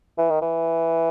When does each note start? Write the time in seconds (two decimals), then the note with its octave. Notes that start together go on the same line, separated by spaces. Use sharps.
0.18 E3
0.30 D#3
0.41 E3